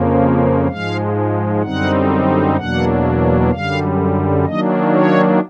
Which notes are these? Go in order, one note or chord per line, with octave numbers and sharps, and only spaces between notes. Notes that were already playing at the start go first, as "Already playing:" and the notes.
Already playing: F2 C#3 F3 A#3
G#2 F3 G#3 F5
F#2 D3 G3 C4 D#4 F#5
E2 B2 F#3 A#3 D4 F#5
F#2 D3 G3 F5
D#3 F#3 A#3 D4 D#5
C#5